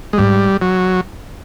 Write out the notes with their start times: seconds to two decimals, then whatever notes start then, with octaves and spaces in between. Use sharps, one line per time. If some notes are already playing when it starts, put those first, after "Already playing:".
0.13 G#3
0.18 G#2 G3
0.62 F#3